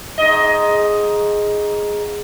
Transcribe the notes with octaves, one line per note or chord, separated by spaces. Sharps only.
G#2 D#5